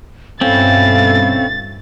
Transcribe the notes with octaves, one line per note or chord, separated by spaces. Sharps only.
G2 B2 C4 C#4 E4 A4 F5 A6